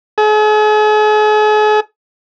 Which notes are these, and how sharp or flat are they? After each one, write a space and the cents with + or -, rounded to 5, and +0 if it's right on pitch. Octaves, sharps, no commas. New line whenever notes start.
G#4 +45